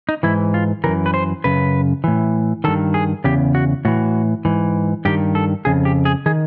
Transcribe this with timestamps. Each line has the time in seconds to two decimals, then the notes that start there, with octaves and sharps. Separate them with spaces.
0.09 D#4
0.23 G#2 E3 E4
0.54 F4
0.84 F#2 C#3 E3 A#4
1.06 B4
1.14 C5
1.44 F#2 C#3 B4
2.04 A2 E3
2.64 G2 D#3 A4
2.94 G#4
3.24 E2 C#3 G4
3.55 F#4
3.85 A2 E3 F#4
4.45 G#2 E3
5.05 G2 D#3 G4
5.35 A4
5.65 F2 C#3 G#4
5.85 G4
6.05 G#4
6.26 D#3 G#4